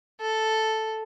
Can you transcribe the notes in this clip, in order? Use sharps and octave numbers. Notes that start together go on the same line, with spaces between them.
A4